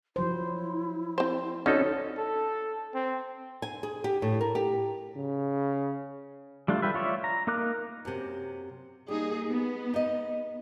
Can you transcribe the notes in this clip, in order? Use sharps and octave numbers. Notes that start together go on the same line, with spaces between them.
F3 F#3 E4 C5
C4 C5
D3 C4 C#4 D#4 F#4 A4 C#5
A4
C4
G#5
G#4
G4
A2
A#4
G4
C#3
G3 A3 D4 F4
G3 F4 G4 B4 E5
F4 C#5 D5 E5
A#5
A#3 D#4 A#4 D6 F#6
F#2 C3
G3 A#3 D#4 G#4
B3
D#4 D#5